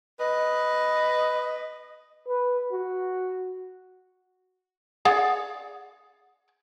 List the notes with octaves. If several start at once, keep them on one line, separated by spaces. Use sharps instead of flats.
B4 D#5
B4
F#4
G#4 D5 F#5